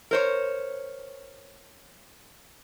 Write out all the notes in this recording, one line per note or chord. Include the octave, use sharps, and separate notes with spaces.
A#4 C5 C#5